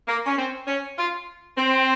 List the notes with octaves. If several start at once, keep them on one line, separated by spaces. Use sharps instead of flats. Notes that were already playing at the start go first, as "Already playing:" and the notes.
A#3
C#4
C4
C#4
F4
C4